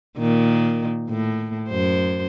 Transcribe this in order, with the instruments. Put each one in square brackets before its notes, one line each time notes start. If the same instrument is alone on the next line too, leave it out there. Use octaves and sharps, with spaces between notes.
[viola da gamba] A#2 D#3
A2
F#2 C5